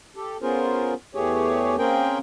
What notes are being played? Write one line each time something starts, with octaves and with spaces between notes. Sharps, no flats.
G4 A4
B3 C#4 F4 G#4 A#4 C5
E2 E3 A3 G4 G#4 C#5
A#3 C4 C#4 G#4 A#4 G5